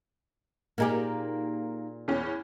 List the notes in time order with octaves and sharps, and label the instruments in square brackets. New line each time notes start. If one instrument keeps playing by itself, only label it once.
[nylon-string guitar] A#2 G#4 [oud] A#3 D#4 G4
[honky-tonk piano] E2 C#4